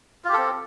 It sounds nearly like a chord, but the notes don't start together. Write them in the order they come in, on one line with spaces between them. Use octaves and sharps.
F4 G4 A4 C4